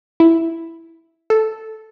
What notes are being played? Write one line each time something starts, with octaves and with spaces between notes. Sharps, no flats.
E4
A4